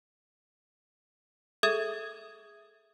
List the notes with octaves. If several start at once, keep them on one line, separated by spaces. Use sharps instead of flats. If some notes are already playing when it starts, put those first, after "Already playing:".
G#4 A4 E5 D#6 G#6